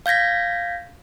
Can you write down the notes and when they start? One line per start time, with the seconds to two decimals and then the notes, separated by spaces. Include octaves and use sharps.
0.06 F5 G6 G#6 A#6 B6